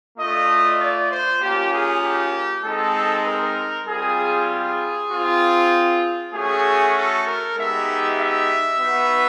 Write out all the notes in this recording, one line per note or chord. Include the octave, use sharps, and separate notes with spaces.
A3 D4 F4 D#5
D5
C5
A#3 C#4 F4 G4
G#4
G4
G#3 C4 D#4 A4
A#4
G3 C4 F4 G#4
G#4
C4 F4
A3 C#4 F#4 G#4
A4
A#4
G#3 B3 D#4 G4 E5
E5
B3 D#4 F#4